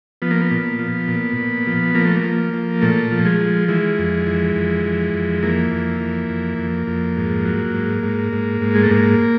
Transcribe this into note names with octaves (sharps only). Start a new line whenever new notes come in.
F3 B3
A#3
B3
A#2
F3
A#2
A#2
F3
F3 A#3
A3
A#3
F3
F3
A#2 A3
F3
G#3
F3
E3 G#3
F2
E3
F2
E3
F2
E3 A#3
F2
E3
F2
F2
F2
G#2
F#3
G#2
G#2
G#2
G#2
G#3
A3
G#2 A#3